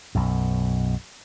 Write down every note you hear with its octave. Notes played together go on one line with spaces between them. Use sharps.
B1 F#2